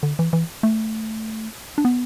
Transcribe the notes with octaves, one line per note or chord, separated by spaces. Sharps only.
D3
E3
E3
A3
D4
B3